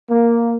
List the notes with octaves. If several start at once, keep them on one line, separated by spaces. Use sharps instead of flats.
A#3